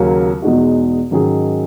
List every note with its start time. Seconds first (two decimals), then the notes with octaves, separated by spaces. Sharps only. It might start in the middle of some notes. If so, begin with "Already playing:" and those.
Already playing: D#2 C#3 F#3 A#3 C#4
0.42 E2 B2 G#3 D#4 F#4
1.11 G#2 D#3 F#3 C#4 G#4